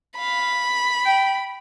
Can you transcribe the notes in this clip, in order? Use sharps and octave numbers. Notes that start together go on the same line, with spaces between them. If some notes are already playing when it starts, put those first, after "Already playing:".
F5 B5
G5